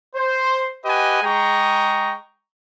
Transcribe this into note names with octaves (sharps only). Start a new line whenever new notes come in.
C5
G4 B4 D#5 F#5 G#5
G#3 G#4 G5 A#5 C#6